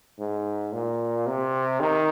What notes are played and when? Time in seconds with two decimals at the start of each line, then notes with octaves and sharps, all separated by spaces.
0.19 G#2
0.73 A#2
1.27 C3
1.80 D#3